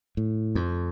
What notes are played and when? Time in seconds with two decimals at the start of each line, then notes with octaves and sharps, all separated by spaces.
0.17 A2
0.55 F2